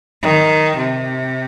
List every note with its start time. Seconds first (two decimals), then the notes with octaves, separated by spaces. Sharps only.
0.22 D#3
0.76 C3